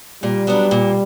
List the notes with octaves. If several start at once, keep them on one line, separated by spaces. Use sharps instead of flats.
A#2 G3
F#3 B3 D4
A#2